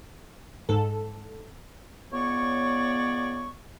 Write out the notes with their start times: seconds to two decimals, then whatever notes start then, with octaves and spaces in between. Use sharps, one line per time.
0.69 G#2 A4
2.12 C#2 B3 C#5 D5 C#6